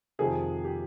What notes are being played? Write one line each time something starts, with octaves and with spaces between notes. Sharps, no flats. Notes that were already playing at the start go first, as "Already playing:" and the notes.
F2 C3 D#3 G#4
G4